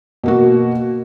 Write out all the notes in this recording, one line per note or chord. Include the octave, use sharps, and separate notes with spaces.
B2 A#3 F#4